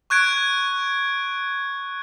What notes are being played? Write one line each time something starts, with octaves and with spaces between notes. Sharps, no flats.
C#6 F#6 G#6 D7